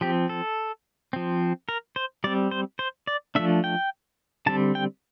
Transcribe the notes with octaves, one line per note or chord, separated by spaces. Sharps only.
F3 C4 G4
A4
F3 C4
A#4
C5
G3 C4 D5
C5
C5
D5
F3 A3 D4 E5
G5
D3 G3 C4 A5
G5